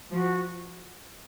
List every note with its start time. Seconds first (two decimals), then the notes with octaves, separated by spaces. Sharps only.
0.11 F3 F#4